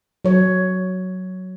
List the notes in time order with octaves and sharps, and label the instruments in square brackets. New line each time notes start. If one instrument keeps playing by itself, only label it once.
[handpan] F#3 C#5